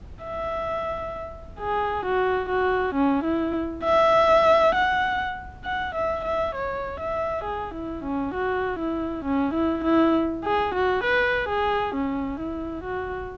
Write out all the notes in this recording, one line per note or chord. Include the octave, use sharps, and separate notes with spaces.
E5
G#4
F#4
F#4
C#4
E4
E5
F#5
F#5
E5
E5
C#5
E5
G#4
E4
C#4
F#4
E4
C#4
E4
E4
G#4
F#4
B4
G#4
C#4
E4
F#4